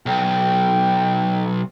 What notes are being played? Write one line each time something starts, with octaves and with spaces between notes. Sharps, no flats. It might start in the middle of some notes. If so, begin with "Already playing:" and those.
B1 G5